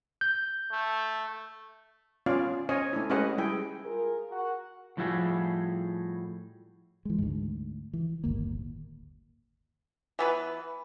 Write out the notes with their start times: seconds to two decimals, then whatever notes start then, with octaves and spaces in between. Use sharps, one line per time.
0.21 G6
0.72 A3
2.26 B3 C#4 F4 D5 F5
2.69 C#4 C5 C#5 D#5 G#5
2.93 A3 D4 E4
3.10 G#3 C#4 G4 B4 D#5 F#5
3.38 G3 E4 G#4 G5
3.85 F4 G#4 A#4
4.30 F#4 A#4 F#5
4.97 A2 F3 G3 E4 F#4 G#4
7.05 E3 G#3
7.18 D2 G#2
7.93 E3
8.24 D1 G1 D#2 A#3
10.19 E3 B3 B4